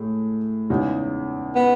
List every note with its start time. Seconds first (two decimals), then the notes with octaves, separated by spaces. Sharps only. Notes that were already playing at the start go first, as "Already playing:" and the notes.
Already playing: A2 G#3
0.70 E2 C#3 G#3 D#4
1.55 B3